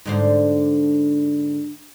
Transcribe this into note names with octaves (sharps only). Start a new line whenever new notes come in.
G#2 D3 C5